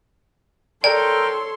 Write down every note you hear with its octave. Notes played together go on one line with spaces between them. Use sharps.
A4 A#4 C#5 D5 G5 C6